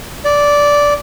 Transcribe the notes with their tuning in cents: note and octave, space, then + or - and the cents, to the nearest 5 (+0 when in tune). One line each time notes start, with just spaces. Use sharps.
D5 -10